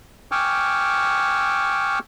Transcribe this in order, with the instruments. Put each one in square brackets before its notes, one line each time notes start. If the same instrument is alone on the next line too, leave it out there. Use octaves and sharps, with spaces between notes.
[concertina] G5 G#5 C#6 D6 E6 F6